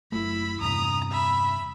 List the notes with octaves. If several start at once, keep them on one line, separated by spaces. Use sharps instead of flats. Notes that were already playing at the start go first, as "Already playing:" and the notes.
F#1 A3 E4 B5
E2 G2 C3 A#5 D#6
E5 B5